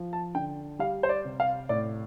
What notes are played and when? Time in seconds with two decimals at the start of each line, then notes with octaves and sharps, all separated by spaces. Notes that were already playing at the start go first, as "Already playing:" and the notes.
Already playing: F3
0.13 A5
0.35 D3 G5
0.79 G3 F5
1.03 C5
1.09 D5
1.25 C3
1.40 F5
1.69 A2 D5